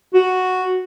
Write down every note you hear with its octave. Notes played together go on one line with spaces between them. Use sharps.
F#4